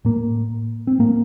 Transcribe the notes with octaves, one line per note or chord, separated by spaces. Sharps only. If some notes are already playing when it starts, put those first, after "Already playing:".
A2 A#3
C4
A2 A#3